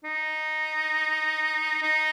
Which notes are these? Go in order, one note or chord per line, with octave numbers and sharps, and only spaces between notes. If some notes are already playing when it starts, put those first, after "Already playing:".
D#4
D#4